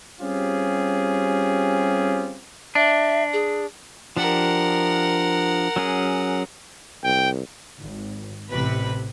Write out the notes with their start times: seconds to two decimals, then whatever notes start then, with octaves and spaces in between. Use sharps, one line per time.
0.21 G3 C4 C#4 F4 G4 G#4
2.75 D4 E5
3.33 G#4
4.17 F3 D4 G4 A#4 F#5
5.76 F#3 C#4 G#4
7.04 C2 G5
7.79 G#1
8.49 A1 C3 B4 B5